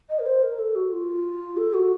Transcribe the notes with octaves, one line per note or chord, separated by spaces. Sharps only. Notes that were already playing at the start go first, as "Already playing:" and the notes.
D#5
A#4
C5
A#4
A4
F#4
F4
A4
F#4